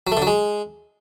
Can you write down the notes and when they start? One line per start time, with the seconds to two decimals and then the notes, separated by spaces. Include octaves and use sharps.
0.07 F#3
0.12 A3
0.17 D3
0.22 F#3
0.27 G#3